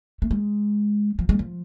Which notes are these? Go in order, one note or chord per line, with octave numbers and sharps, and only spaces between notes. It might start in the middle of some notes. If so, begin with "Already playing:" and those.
A3
G#3
F3
G#3
F3